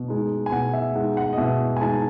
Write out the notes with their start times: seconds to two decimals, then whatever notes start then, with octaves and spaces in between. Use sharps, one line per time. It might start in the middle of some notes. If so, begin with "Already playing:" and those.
Already playing: B2
0.08 G#3 D#4
0.46 G#5
0.52 B2 F#5
0.73 E5
0.95 G#3 D#4 F#5
1.17 F#5
1.33 D#5
1.38 B2 E5
1.76 G#5
1.81 G#3 D#4 A5